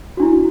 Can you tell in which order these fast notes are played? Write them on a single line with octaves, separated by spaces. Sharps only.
F#4 D4 E4